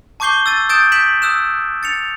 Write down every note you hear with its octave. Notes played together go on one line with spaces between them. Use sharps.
A5 C#6 D6 G6 C7 G7
E6 A6 D#7
D#6 G6 A6 D7 E7
G6 B6 D7 E7 F#7
D#6 E6 F#6 E7
A6 C#7 F7